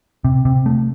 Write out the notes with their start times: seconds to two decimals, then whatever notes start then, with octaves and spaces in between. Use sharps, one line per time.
0.24 C3
0.45 C3
0.66 A3